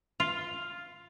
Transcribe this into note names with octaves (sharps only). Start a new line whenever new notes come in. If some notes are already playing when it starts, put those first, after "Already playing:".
F4